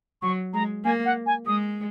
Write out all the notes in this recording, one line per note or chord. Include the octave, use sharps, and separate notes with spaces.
F#3 C#6
G#3 A#5
A#3 G#5
F#5
G#5
G#3 D#6